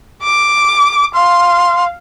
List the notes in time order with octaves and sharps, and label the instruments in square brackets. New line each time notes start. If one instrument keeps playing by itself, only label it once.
[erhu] D6
[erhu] F5 [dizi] C6